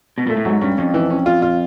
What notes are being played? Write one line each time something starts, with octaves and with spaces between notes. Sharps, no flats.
B2
A#2 A3
A2
G#2 F#3
G2 C#4
F2 C#4
E3
C#4
F4
F4